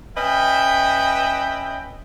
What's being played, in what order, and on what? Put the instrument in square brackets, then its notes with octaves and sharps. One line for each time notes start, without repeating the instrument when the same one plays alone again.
[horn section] C#4 B4 D#5 E5 G5